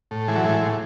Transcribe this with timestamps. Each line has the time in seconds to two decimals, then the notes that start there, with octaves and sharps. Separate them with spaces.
0.11 A2
0.28 E3 G#3
0.36 F#3
0.44 A2 G#3
0.62 A2